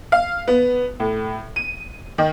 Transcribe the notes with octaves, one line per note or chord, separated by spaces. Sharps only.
F5
B3
A2
D#7
D#3